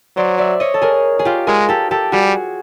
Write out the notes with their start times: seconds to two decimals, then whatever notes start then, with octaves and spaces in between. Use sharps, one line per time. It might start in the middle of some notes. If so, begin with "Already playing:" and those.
0.16 F#3 C5 D5
0.38 D5 E5
0.60 C#5 D#5
0.74 A4
0.82 G#4 A#4
1.19 G#4
1.25 F4 G4
1.47 G#3 G#4 A#4
1.69 G4 A4
1.91 G4 A4
2.12 G3 F#4 G#4